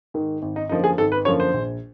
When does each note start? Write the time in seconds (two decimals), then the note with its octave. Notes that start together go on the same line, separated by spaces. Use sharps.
0.14 G#2 D#3
0.42 G#1
0.56 D#4
0.69 F#2 D3 F3 A#3 D#4
0.84 G#4
0.98 G#1 A4
1.12 B4
1.25 F#2 D3 F3 A#3 C#5
1.40 C5
1.54 A#1